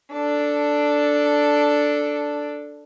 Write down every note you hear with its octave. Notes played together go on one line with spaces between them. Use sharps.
D4 A4